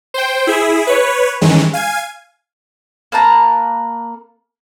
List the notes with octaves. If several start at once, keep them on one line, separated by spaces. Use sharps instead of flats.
C5 G5
E4 G#4 E5
B4 C#5
G2 D#3 E3 G#3 C#4
F5 G#5 G#6
A#3 B4 A5 A#5